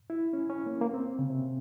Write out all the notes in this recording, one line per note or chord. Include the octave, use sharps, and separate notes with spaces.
E4
C#4
C#4
A#3
A#3
C4
C#3
C3